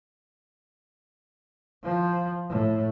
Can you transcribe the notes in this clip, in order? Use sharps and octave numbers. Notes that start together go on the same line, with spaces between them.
F3
A2